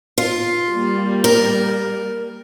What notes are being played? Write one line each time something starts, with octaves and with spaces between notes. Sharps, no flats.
F4
G3 A#3
A#4